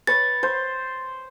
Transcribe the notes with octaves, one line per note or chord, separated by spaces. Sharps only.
B4 C#5 A6
C5